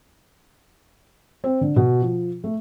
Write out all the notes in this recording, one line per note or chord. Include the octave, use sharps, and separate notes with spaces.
C4
D3
B2
F3
A3